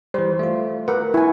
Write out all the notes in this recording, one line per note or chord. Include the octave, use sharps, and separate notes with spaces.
E3 G3 C5
A3 F4
A#4 B4 F#5
E4 G#5